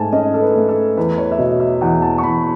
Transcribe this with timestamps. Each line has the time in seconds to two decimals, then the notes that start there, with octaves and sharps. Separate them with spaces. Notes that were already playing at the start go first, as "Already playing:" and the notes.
Already playing: G#2 A3 G#5 A5
0.13 C#4 D#5
0.34 A4
0.41 B4
0.55 A3
0.69 A4
0.97 E2 B4
1.18 C#5
1.32 E5
1.38 B2 D#5
1.60 E5
1.81 E2 F#5
2.02 A5
2.18 C#6
2.23 E2 B5